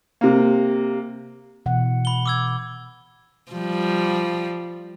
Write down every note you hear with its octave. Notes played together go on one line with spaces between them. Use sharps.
C3 A#3
B2 E3 F#5
B5 G7
D6 E6 G#6
F3 G3